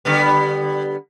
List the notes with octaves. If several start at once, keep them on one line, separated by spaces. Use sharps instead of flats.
D3 G3 B3